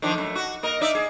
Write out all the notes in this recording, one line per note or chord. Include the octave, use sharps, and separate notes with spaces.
D#3 F3 D4
F#2 A3
F#4
A#3 A#4 D#5
D#4 D5 E5
G#4